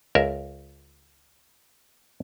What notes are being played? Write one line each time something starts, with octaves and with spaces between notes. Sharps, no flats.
C#2 A#4 E5